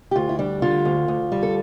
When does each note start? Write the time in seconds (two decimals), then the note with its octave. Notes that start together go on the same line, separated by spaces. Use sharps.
0.11 G4
0.16 D2 F4
0.29 E4
0.39 G3 D4
0.62 D3 F4
0.85 D2
1.08 D2
1.32 G3
1.43 A4